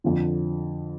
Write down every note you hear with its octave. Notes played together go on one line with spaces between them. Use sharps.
F2 D3 F3